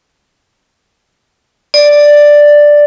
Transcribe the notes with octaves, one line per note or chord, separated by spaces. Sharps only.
D5